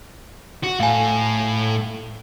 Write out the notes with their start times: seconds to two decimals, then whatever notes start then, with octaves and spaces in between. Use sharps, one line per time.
0.63 F#4
0.80 A2 A3 F5 G#5